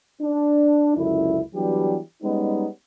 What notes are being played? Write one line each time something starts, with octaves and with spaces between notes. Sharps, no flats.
D4
C#2 F#2 D3 E4
E3 F#3 G3 B3 D4 G4
G3 G#3 B3 C#4 D#4